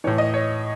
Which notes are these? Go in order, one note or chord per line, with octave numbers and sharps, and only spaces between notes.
A2 E3 C#5
D#5
C#5